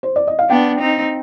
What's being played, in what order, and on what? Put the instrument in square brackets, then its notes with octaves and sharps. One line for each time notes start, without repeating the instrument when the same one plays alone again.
[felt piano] C5
D5
D#5
F5
[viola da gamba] B3 D4 [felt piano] G5
[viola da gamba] C4 D#4